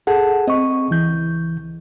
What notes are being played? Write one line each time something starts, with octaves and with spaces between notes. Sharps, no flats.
G#4 A4 F#5
C4 D#5 C#6
C#2 E3 G6